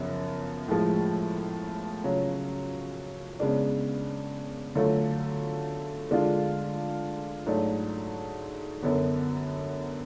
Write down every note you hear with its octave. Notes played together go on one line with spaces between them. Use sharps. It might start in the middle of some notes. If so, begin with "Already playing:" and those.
Already playing: F#2 C#3 F3 B3
A2 F3 G#3
C#3 F#3 C#4 F4
C#3 G#3 B3 D4
D3 F#3 A3 F4
D3 G#3 D4 F4
G#2 F#3 A3 D4
F#2 D3 F#3 B3